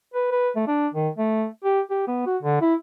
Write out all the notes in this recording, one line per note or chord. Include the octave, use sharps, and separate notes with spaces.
B4
B4
A3
D4
D#3
A3
G4
G4
B3
F#4
D3
E4